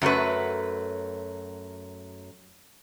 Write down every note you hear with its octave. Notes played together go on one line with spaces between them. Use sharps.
F#2 F#3 A3 B4